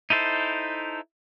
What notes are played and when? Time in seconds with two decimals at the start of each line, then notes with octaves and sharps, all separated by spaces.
0.10 D#4 E4 A4 C5